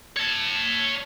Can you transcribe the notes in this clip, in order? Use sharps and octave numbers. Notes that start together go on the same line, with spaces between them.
C#5 A5